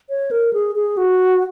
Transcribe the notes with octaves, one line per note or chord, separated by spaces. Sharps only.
C#5
A#4
G#4
G#4
F#4